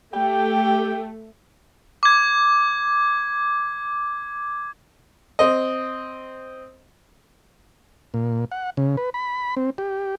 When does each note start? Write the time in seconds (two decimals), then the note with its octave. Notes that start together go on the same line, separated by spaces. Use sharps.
0.14 A3 G4 G5
2.03 D6 G#6
5.39 C4 D#5
8.14 A#2
8.52 F#5
8.77 C#3
8.97 B4
9.14 B5
9.57 C4
9.78 G4